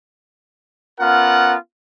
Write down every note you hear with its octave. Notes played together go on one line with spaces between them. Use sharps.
B3 C#4 F4 A#4 F#5